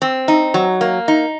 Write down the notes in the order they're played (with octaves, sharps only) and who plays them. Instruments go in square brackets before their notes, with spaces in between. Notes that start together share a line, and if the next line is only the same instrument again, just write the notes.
[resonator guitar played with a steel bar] C4
D#4
F#3
A#3
D#4